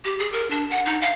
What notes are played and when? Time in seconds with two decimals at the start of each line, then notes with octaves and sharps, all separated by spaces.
0.05 G4
0.19 G#4
0.32 A#4
0.51 D4
0.70 F#5
0.86 D#4
1.02 F5